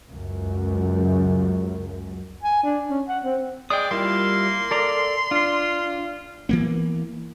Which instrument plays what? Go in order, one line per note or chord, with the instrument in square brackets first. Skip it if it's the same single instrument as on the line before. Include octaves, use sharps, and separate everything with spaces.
[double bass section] C#2 F#2
[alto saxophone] G#5
D4
C#4
F#5
C4
[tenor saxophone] G#3 [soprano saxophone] D5 [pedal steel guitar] G5 D#6
[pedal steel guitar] G3 E4 F4 [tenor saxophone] A#3 [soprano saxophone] C6
[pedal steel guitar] A4 D5 A#5
[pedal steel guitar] D4 [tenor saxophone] F4
[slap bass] E3 A#3 B3